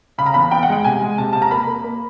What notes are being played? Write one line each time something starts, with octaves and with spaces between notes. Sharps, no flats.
C#3 B5
A#5
E2 B5
E2 G5
F#5
G#3 G5
C3 G#5
G#3
C3 A5
C3 A5
A#5
A#3 B5
A#3
A#3